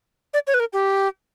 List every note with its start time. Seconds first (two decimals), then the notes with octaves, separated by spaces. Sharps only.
0.33 D5
0.47 C#5
0.54 B4
0.60 A#4
0.73 G4